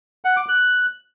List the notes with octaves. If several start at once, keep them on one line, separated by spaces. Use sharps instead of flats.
F#5
D6
F#6